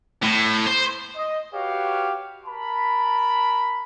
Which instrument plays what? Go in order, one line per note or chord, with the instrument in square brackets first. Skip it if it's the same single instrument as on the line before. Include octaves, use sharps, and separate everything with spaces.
[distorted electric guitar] A2
C5
[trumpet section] D#5
F#4 G4 B4 C#5 F5
A#4 A5 B5